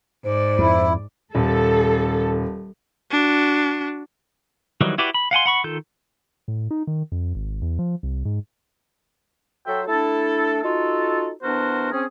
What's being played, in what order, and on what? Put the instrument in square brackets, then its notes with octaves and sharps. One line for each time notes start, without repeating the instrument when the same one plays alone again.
[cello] G#2 D5 [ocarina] C5
[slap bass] F2 [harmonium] E4
[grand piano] D#1 [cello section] A4
[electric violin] D4 F#4
[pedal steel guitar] D#3 E3 F#3 G3 D#4
E4 F#4 G4 B4 D5
B5
F5 F#5 G#5 C6
F#5 B5 C#6
D#3 F4 A4 G6
[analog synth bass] A2
D#4
D#3
F2
G#1
E2
F3
C2
G#2
[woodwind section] F#3 F#4 A4 C5 E5 G5
A3 D4 E4 A4
D#4 F4 F#4 A4
E3 B3 D4 F#4 A#4 C5
C4 C#4 G#4